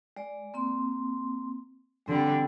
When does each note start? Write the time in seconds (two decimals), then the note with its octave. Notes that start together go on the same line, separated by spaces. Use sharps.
0.17 G#3 D5
0.54 A#3 C4 C6
2.06 D3 G3 G#3 C4